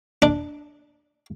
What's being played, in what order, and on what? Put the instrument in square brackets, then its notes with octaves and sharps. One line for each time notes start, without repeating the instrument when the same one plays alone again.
[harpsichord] D4